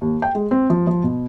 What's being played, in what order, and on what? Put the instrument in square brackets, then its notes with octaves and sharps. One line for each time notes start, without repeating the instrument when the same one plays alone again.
[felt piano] D#2
G5
G#3
C4
F3
F3
B2